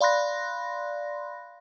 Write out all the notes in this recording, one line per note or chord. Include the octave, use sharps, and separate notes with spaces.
D5 F5 B5 C6 F#6 A#6